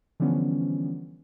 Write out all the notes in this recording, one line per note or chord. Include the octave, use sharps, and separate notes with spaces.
D3 E3 F3 G3 B3 C#4